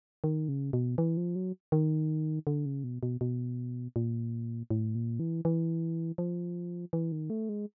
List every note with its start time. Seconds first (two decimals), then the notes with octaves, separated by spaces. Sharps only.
0.24 D#3
0.49 C#3
0.73 B2
0.98 E3
1.17 F3
1.36 F#3
1.72 D#3
2.47 D3
2.66 C#3
2.84 B2
3.03 B2
3.21 B2
3.96 A#2
4.70 A2
4.95 A#2
5.19 E3
5.45 E3
6.18 F3
6.93 E3
7.12 D#3
7.30 A3
7.49 G#3